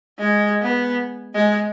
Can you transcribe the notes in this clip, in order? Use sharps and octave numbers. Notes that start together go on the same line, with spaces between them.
G#3
B3
G#3